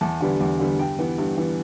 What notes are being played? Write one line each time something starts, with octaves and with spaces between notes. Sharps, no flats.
E2 A5
D3 G3 B3
E2
D3 G3 B3
G2 G5
E3 B3
G2
E3 B3